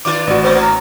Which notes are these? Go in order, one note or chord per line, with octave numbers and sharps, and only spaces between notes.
D#3 D4 F4 D6
A1 F#4 D5
F#3 A#3 B3 C5
A#5